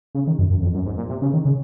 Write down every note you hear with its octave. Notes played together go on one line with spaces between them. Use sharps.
C#3
D#3
F#2
F#2
F2
F#2
G#2
A#2
C3
C#3
D#3
C#3